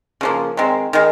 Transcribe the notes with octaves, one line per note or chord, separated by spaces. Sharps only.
C#3 F3 A#3
D#3 G#3 C4
D#3 G#3